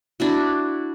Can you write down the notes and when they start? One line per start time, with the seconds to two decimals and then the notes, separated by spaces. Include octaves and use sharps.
0.20 D4 E4 F#4